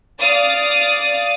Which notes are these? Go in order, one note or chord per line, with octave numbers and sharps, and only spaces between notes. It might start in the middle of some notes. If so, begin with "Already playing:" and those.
D5 F5 D#6 A6